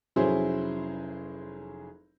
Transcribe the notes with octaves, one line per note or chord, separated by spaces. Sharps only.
F1 F#3 C#4 E4 G#4 C5